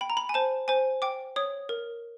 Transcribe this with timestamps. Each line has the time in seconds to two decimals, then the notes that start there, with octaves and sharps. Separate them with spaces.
0.01 G5 B5
0.10 A#5
0.17 B5
0.29 G#5
0.34 C5 A5
0.68 C5 G#5
1.02 G5 D6
1.36 C#5 D#6
1.69 A#4